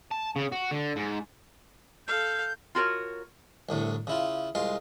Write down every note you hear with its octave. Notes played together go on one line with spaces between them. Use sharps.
A5
C#3
F#4
D3
G#2
A4 F5 G6
F4 F#4 A#4 C#5
C2 A2 D3
C#3 E4 F4
C2 G#3 F4 F5